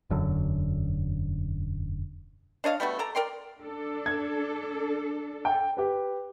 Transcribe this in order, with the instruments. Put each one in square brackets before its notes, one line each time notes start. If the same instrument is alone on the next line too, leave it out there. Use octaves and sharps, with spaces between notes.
[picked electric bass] E1 F#2 D3
[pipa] D4 C#5 D#5 F5
G3 A3 B3 F#4
A4 D5 A#5
A#4 D5 G5 C6
[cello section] D4 A4
[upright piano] G#6
G5
G4 B4